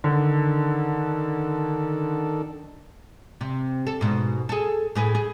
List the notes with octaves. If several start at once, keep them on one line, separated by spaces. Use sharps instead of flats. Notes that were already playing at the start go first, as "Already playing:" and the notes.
D3 D#3 D4 A4
C3
A4
G#2 B2
G#4 A4
A2 G#4 B4
G#4